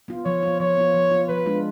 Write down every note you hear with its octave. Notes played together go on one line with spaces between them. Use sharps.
B3 F4
F3 C#5
B3 F4
F3 C#5
B3 F4
F3
B3 F4
F3 B4
G#3 D4 F4